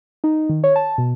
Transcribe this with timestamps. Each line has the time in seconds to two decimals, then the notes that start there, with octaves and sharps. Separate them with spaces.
0.24 D#4
0.49 D#3
0.64 C#5
0.76 A5
0.98 B2